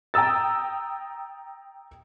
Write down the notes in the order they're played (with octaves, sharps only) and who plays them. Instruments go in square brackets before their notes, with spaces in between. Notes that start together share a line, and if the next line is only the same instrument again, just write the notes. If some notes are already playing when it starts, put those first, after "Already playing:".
[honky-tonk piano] G5 A#5 D#6 E6 A6